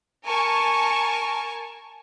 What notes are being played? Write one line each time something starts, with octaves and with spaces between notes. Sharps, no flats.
A#4 G#5 A5 C#6